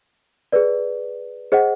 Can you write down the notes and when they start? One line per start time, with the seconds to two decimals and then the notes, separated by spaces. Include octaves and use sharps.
0.52 G#4 B4 D5
1.52 G#4 C5 D#5 F#5